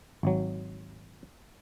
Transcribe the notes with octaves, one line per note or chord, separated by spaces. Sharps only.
G#1 F#3